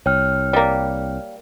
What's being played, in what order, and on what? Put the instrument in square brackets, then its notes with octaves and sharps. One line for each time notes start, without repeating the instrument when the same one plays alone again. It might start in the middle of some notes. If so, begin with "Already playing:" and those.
[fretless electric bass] C2 [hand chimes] C#5 G5 F6
[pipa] G3 A#3